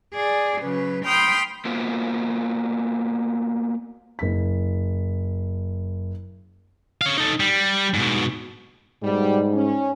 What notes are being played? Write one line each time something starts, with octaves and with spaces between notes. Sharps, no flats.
G#4 D5
C#3 F#3 B4
G5 B5 C6 D#6 F6 G6
A#3 B3 F4 F#4 C5
F#1 B6
C#5 F5
D#4 A4
G3
G#2 B2
G#2 B2 G3
C#4